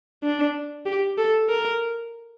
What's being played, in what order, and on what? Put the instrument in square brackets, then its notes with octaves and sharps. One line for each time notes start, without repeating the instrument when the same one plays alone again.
[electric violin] D4
G4
A4
A#4